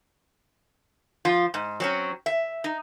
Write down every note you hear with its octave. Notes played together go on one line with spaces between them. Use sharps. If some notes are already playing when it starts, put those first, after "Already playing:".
F3 F4
G#2
F#3 C4 C#4
E5
D#4